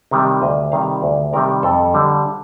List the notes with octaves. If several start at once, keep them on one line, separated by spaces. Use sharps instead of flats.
C3 D#3 G3
D2 D#5
C3 D#3 G3 F5
D2 D5
C3 D#3 G3 A#4
F2 A4
D3 G3